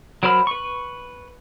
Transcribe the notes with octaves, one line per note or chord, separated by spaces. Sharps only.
F#3 A#4 C5 B5 F6
B4 C#6